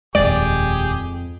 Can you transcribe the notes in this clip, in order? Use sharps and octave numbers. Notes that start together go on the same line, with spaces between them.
D#1 F2 G#3 G4 G#4 D5 D6